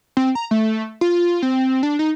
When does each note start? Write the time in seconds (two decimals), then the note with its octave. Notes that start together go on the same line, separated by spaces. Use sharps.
0.17 C4
0.35 A#5
0.51 A3
1.01 F4
1.42 C4
1.83 D4
1.99 D#4